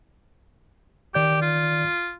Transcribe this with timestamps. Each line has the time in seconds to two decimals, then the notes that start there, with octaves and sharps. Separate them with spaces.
1.14 D#3 G4 D5 G6
1.42 F4